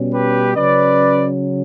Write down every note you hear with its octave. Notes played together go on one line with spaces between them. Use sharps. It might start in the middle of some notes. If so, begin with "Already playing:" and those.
Already playing: B2 G3 C#4
G4 B4
C#3 F#3 C#4 B4 D5